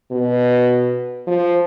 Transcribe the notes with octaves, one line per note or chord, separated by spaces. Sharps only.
B2
F3